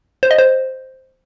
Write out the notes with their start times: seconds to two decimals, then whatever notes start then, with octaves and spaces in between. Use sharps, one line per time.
0.23 C5
0.31 D#5
0.39 C5